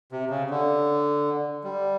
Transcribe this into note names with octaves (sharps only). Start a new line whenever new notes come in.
C3
C#3
D3
G3